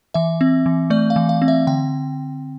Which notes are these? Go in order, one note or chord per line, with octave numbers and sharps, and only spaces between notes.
E3 E5
C4
E3
A3 D5
F5
E3
F5
C4
E5
D3 G5